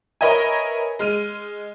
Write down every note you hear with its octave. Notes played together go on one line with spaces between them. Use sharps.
A#4 B4 C#5 D#5 E5 G#5
G#3 F6 D#7